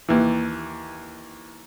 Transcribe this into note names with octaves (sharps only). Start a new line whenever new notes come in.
D#2 E3